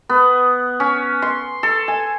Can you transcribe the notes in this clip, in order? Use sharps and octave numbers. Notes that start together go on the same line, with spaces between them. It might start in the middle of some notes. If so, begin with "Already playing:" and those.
B3
C#4
C6
A4
G#5